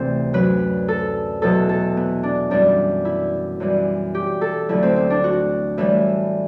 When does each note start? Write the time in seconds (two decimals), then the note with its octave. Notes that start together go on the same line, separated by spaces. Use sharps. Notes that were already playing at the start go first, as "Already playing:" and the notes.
Already playing: D2 C3 E3 C4
0.33 F#2 F#3 B4
0.88 A4
1.42 E2 B2 F#3 A4
1.69 A4
1.97 B3
2.23 D4
2.51 F#2 E3 G3 D4
3.05 E4
3.60 F#2 E3 G3
4.15 G4
4.41 A4
4.69 D2 D3 F#3 E4
4.83 C4
4.96 C4
5.10 D4
5.24 F#4
5.78 A2 E3 G3 E4